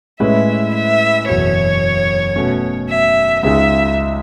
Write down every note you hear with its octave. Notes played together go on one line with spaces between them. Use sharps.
A2 G#3 C#4 E4 B4 E5
E5
F#1 E2 B2 C#5
B2 A3 C#4
E5
C#2 C#3 G#3 D#4 E5